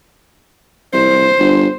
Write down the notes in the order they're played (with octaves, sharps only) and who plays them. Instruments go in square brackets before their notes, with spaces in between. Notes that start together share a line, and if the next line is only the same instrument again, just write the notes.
[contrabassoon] C2 [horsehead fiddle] C5
[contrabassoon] G1